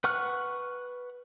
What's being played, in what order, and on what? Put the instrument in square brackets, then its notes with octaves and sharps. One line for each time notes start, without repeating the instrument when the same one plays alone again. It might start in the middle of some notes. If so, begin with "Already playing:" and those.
[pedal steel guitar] B4 F#5 C#6 F6 F#6